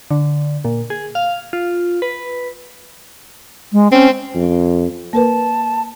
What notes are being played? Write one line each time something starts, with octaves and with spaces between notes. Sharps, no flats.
D3
A#2
G#4
F5
F4
B4
G#3
C4 C#4
F2
A#3 A#4 B4 A5